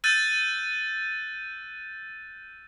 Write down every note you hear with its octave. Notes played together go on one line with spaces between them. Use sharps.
E6 F#6 G6 A6 D#7